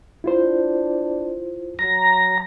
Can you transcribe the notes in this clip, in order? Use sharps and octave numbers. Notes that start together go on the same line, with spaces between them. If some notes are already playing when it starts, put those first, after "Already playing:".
D4 E4 F4 C5
F#3 A#5